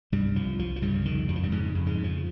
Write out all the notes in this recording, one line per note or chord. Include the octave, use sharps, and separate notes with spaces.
C2 G2 G3
C2 F3
C2 F3
F3
G2 C#3 G3
F2 D#3
F2 G3
F3
G2 G3
G#2 C#3 G#3
F2
G#2 G#3
C#3
F3